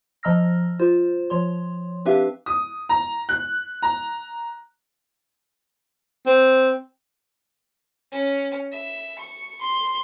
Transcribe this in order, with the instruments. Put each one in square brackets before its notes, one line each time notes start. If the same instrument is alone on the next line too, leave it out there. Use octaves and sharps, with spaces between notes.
[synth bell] F3 D#5 A#5 E6 F6 A#6
F4 C5
F3 C#5 C6
C4 D4 G4 B4 E5 F5
[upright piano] D#6
A#5
F#6
A#5
[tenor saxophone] C4
[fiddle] C#4
E5
C#6
C6